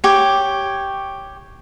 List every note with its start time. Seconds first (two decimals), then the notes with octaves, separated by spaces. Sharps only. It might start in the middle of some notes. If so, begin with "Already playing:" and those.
0.04 G4 C#5